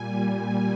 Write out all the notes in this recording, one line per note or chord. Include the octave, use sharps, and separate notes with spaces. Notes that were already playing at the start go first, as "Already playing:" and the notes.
Already playing: A#2 G3 G#5